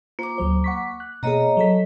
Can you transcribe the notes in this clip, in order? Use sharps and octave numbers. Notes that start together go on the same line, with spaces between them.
A#3 F4 C5 D6
D2 F#3 C5
F#5 C#6 B6
F#6
B2 A#3 G#4 C#5 D#5 A#5
F#3 A4 B6